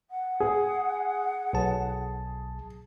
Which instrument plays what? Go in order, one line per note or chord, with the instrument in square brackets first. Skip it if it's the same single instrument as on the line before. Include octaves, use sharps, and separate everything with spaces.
[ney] F#5
[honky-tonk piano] G#4
[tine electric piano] B1 A5